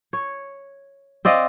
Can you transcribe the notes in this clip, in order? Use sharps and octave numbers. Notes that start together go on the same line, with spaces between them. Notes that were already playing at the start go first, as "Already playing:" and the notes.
C#5
C4 D5 D#5 F5